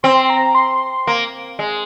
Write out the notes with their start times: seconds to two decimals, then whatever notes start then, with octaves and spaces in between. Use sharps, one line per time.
0.03 C4 C6
0.30 A#5
0.55 C6
1.07 A#3
1.59 G#3